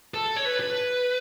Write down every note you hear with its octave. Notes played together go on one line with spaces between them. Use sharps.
A4
C#5
B4
B4